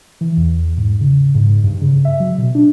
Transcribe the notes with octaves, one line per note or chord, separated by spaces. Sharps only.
E3
E2
G#2
C#3
G#2
G2
C#3
E5
F#3
B2
D4